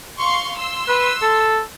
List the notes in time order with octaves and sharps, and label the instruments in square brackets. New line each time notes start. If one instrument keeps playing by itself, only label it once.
[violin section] F5 C6 C#6
C6 E6
[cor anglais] B4
A4